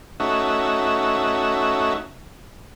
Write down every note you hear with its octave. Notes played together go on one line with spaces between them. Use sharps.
A3 C#4 D#4 F#4 E5